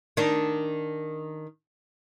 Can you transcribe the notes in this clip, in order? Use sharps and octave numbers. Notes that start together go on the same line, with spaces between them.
D#3 D4